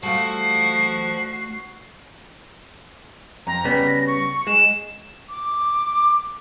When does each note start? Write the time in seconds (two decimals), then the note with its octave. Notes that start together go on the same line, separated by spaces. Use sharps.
0.03 G3 A3 F4 F#4 C5 A5 C7
3.47 F2 A#5
3.64 C#3 G3 B3 B6
3.87 A#6
4.07 C#6
4.47 G#3 E7
5.30 D6